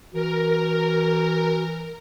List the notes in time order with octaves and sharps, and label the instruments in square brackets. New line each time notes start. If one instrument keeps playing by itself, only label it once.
[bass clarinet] E3 [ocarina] F#4 [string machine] A#4